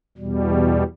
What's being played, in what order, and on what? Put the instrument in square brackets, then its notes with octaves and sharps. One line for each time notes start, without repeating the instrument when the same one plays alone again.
[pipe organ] E2 B2 G3